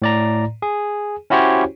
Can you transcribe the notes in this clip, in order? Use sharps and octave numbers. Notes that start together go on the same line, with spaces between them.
A2 D5 A#5
G#4
C#4 E4 F#4 G4 C5 C#5